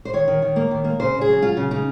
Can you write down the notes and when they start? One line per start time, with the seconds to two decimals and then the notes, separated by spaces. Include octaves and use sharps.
0.05 C5
0.13 D#3 C#5
0.28 D#3
0.42 D#3
0.56 A#3
0.71 D#3
0.84 A#3
1.00 C#3 C5
1.14 C#3
1.21 G#4
1.29 F#3
1.42 F#3 F4
1.57 C#3
1.71 C#3 D#4